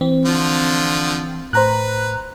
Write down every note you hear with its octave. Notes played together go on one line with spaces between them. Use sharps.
E3 C4
D3 F3 F4
A2 B4 C5 A#5 F#6